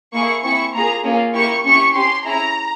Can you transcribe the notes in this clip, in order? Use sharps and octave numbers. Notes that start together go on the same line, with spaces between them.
A#3 E4 G#4 C#6
C4 E4 G#4 C#6
A#3 F4 G#4 A#5
A#3 C#4 F4 G#4
A#3 E4 G4 C#6
C#4 E4 G4 C#6
C#4 G4 C6
C#4 E4 G#4 A#5